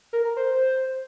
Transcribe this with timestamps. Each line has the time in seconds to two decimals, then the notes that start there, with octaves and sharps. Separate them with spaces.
0.13 A#4
0.25 A#4
0.37 C5